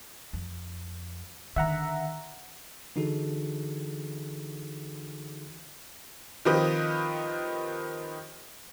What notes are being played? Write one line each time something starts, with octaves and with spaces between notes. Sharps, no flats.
F2
D3 D#3 E5 F#5 A#5
D3 E3 D#4 F#4 G#4 A4
D#3 F3 C4 G4 B4 D#5